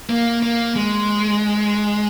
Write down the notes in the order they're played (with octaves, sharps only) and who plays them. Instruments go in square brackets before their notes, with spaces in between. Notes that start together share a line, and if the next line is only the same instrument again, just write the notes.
[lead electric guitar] A#3
A#3
G#3